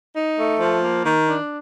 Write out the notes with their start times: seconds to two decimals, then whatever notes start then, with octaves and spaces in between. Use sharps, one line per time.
0.16 D#4
0.38 A3
0.59 F3
0.83 A#3
1.04 D#3
1.27 D4